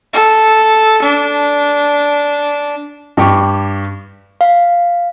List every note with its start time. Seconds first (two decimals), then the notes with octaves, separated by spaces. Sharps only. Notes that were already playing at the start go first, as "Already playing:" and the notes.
0.14 A4
1.02 D4
3.17 G2 G4 C#6
4.41 F5